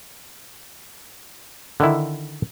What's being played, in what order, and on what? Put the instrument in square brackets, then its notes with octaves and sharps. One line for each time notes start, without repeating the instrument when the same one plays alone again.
[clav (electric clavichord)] D3 D#3 E4